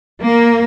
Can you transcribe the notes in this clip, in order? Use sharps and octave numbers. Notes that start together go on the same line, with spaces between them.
A#3